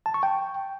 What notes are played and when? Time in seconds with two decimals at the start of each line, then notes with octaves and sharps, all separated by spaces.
0.06 A5
0.14 C#6
0.23 G5